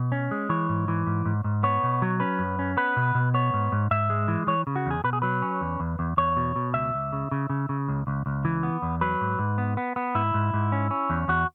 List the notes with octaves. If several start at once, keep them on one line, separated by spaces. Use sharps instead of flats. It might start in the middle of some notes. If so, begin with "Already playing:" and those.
Already playing: B2
C#4
G#3
E3 C#5
G#2
E3
G#2
G#2
G#2
B3 C#5
B2
F#3
C#4 B4
F#2
C#4
B3 B4
B2
B2
B3 C#5
G#2
G#2
G#2 E5
G#3
E3
E3 C#5
C#3
F#4
E2 G#4
B2 B4
G#4
F#3 B4
C#4
E2
E2
E2
E2 C#5
B2
B2
C#2 E5
C#2
C#3
C#3
C#3
C#3
C#2
C#2
C#2
E3
B3
E2
F#3 B4
G#2
G#2
B3
B3
B3
G#2 E4
G#2
G#2
C#4
C#4
E2
E2 F#4